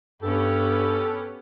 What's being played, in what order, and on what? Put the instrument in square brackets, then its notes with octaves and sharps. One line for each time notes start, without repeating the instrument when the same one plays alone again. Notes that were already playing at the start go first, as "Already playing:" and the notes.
[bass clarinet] G2 [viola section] B3 C#4 G4 [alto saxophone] A4